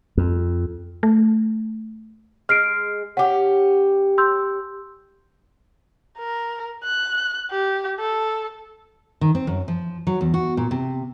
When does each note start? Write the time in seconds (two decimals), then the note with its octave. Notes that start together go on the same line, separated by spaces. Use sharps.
0.17 F2
1.03 A3
2.49 G#3 F6 C7 D7
3.17 C#4 G4 F#5
4.18 C6 E6 G6
6.18 A#4
6.84 F#6
7.51 G4
7.99 A4
9.21 D#3
9.35 C4
9.47 F#2
9.68 F3
10.07 F#3
10.21 E2
10.34 F#4
10.57 A#2
10.71 C3